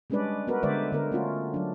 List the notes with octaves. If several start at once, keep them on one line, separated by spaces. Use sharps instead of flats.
G3 G#3 C#4 D4 B4 D5
B3 F#4 A#4 B4
D3 G#3 B4 C5 D5 E5
D3 B3 A#4
A3 C#4 F4 F#4
F#3 D4